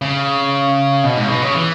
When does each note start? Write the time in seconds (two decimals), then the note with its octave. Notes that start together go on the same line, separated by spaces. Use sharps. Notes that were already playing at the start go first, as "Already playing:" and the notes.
0.02 C#3
1.03 B2
1.17 G#2
1.25 C#3
1.29 B2
1.42 C#3
1.55 E3